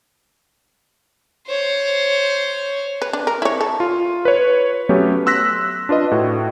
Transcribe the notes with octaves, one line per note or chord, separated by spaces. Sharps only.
C5 C#5
B4
D4
A#4
E4 C#5
A4
F4
B4 C#5
F#3 A3 B3 C#4 G4
C6 E6 F#6 A#6 B6
D4 F4 B4 D#5
A2 F#4